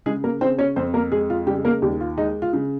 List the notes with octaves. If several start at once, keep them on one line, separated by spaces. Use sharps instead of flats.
C#3 G#3 G#4
A#3 A#4
C#3 C4 C5
C#4 C#5
F2 C4 C5
A#3 A#4
G#3 G#4
F4
C#3 G3 G4
A#3 A#4
D#2 G3 G4
F4
G#3 D#4
F4
C#3